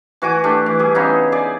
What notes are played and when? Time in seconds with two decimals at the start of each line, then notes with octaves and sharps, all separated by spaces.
0.22 E3 F#4 G#5 D6
0.44 A3 D4 G4
0.66 E3
0.79 G3 G#4
0.95 C#3 B3 D#4 E4
1.32 G#4 D5